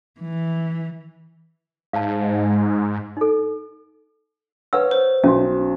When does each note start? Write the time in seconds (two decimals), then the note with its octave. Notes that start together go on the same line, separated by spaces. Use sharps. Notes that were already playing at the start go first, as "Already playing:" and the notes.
0.20 E3
1.93 G#2 F5 A5
3.17 D#4 A4
4.73 B4 C#5 F#5 E6
4.91 C5
5.24 B1 C#4 F#4